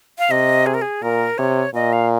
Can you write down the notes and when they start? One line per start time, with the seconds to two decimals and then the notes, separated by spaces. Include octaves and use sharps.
0.19 F5
0.30 C3 D#5
0.66 G#4
0.74 A#4
0.82 G#4
1.02 A#2 A#4
1.38 C3 C#5
1.75 A#2 D#5
1.93 F5